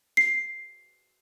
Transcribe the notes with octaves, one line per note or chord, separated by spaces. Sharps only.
C7